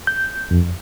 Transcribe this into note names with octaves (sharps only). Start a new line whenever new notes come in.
G6
F2